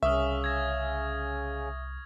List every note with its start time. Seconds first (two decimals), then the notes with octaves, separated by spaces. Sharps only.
0.03 C2 C#3 C#4 E5 C#6 D#6 F6
0.44 G#6 A#6